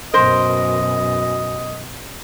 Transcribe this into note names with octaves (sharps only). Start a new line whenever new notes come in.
F#2 B2 A#4 C5 D#5